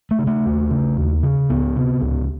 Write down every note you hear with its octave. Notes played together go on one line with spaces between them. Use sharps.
A3
C#3
A3
D#2
C#3
D#2
C#3
C#2 B3
C3
C#2